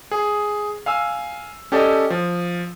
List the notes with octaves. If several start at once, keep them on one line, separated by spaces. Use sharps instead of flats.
G#4
F5 G#5 E6
C#4 G4 A4 D5 D#5
F3